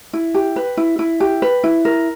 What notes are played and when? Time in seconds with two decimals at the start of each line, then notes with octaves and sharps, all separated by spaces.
0.13 E4
0.34 G4
0.56 B4
0.77 E4
0.99 E4
1.20 G4
1.42 B4
1.64 E4
1.85 A#4